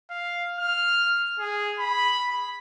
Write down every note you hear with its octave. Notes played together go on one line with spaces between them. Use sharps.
F5
F6
G#4
B5